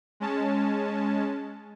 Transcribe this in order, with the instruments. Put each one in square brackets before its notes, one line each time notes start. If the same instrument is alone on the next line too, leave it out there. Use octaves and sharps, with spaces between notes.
[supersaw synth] G#3 C#4 A5